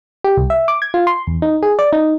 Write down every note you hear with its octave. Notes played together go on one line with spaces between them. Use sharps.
G4
C2
E5
D6
G#6
F4
C6
E2
D#4
G#4
D5
D#4